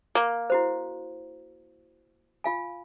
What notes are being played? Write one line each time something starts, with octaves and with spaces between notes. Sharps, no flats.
A#3
E4 F#4 C5
F4 F5 G#5